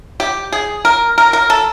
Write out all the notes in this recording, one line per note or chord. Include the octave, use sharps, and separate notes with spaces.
G4
G#4
A#4
A#4
A#4
A4